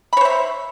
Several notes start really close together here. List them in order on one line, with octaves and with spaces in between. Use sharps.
B5 C#5 C5 E5